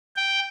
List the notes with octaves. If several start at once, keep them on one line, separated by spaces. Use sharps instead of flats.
G5